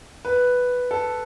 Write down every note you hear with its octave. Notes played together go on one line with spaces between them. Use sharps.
B4
A4